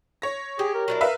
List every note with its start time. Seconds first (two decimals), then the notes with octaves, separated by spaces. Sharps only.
0.22 C#5 A#6
0.59 G4 G#4
0.74 A#4
0.88 F#3 D4 E4
1.01 B4 E5 F5